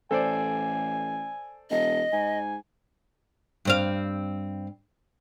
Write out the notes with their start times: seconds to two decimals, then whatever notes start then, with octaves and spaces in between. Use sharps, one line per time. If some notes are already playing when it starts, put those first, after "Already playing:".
0.11 A1 A4 C5 D5 G#5
1.70 E1 D#5
2.13 G#2 G#5
3.65 G2 C4 F5